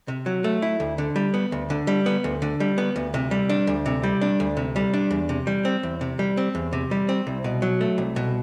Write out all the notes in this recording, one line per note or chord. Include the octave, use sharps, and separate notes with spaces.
C3
F#3
A3
E4
D2
D3
G3
B3
D2
D3
G3
B3
D2
D3
G3
B3
D2
C3
G3
D4
D2
C3
G3
D4
D2
C3
G3
D4
E2
C3
G3
C4
E2
C3
G3
C4
E2
C3
G3
C4
C2
B2
F#3
A3
C2
B2